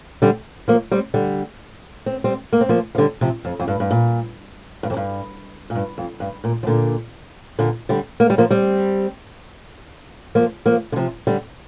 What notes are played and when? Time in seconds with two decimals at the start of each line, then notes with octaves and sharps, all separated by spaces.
0.22 D3 G3
0.68 F3 A#3
0.92 G3 C4
1.14 D3 G3
2.06 C4
2.24 G3 C4
2.53 A#3
2.61 C4
2.69 F3 A#3
2.95 F3
2.98 D3 G3
3.21 C3 F3
3.45 F2
3.60 F2
3.68 G2
3.80 G2
3.91 A#2
4.83 G2
4.90 F2
4.97 G2
5.70 A#2
5.75 G2
5.98 F2
6.20 G2
6.44 A#2
6.63 F3
6.67 A#2 D3
7.59 A#2 D3
7.89 D3 G3
8.20 A#3
8.30 G3
8.38 F3 A#3
8.51 G3 C4
10.35 F3 A#3
10.66 F3 A#3
10.92 D3
10.96 C3 F3
11.27 D3 G3